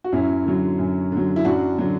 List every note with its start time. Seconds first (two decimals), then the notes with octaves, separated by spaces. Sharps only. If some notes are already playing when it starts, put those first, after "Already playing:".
0.04 F#4
0.12 F#2 C#4 E4
0.45 D3 F#3
0.78 F#2
1.12 D3 F#3
1.36 E4
1.45 F#2 D4 F#4
1.78 D3 F#3